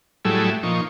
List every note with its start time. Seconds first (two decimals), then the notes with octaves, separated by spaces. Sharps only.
0.25 A2 F#3 G3 A3 E4 G#4
0.63 A#2 F3 D#4 C#6